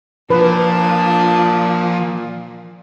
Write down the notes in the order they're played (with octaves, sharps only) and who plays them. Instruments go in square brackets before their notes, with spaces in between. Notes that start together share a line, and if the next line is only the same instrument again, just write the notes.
[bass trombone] A#2 [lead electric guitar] F3 [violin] D4 [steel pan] B4